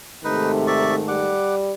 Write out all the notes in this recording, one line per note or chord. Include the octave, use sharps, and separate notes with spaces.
G#2 C3 D#3 A3 D#4 B4
D5 E5 C#6
G3 F#5 D6